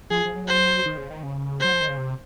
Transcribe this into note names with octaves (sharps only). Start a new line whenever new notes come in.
F3 G#4
F3
F#3
C5
D#3
C#3
D#3
C#3
F#3 C5
F3
D#3
C#3
C3